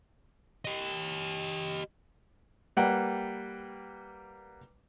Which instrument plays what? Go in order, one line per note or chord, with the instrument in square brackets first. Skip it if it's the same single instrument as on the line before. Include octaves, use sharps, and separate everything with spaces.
[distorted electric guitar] G4 D#5
[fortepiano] G3 A#3 B4 F#5 G5